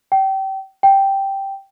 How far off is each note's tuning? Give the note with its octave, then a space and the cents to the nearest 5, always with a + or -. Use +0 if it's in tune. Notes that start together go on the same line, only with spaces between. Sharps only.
G5 -30
G5 -5